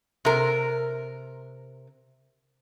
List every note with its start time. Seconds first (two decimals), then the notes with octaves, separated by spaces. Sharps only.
0.25 C3 A#4